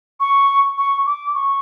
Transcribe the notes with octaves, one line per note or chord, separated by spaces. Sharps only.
C#6
C#6
D6
C#6